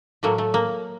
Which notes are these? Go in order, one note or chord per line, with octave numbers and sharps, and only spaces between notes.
A2 F#3 A3 A#3
A3
A#3